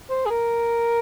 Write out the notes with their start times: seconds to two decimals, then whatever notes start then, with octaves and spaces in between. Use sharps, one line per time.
0.10 C5
0.26 G#4
0.30 A#4